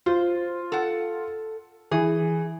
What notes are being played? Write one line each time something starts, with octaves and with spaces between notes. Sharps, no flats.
F4 C5
A4 F#5
E3 G#4